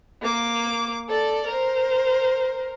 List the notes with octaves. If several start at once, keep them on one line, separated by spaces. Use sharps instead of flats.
A#3 D6
A4 D5
A#4 C5